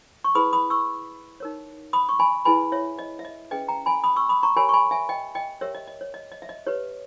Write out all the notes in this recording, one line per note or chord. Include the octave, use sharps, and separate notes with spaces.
C#6
E4 G#4 B4 B5 D#6
B5 D#6
C#6 E6
D#4 A#4 C#5
B5 D#6
C#6
G#5 B5
E4 G#4 B4 G#5 B5
C#5 E5
D#5
E5
D#5
C#4 G#4 B4 D#5 G5
G5 A#5
G#5 B5
B5 D#6
C#6 E6
B5 D#6
A#5 C#6
G4 A#4 C#5 G#5 B5
C#6
G#5 B5
E5 G#5
D#5 G5
D#5 G5
G4 A#4 C#5 E5
D#5
D#5
C#5
D#5
D#5
E5
D#5
G4 B4 C#5